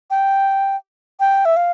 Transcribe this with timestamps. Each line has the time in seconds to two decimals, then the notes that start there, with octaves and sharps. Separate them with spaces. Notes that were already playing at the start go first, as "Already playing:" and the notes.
0.11 G5
1.20 G5
1.45 E5
1.56 F5